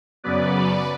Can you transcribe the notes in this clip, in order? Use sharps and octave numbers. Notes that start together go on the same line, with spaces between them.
F#2 C#3 F#3 B3 B4 D5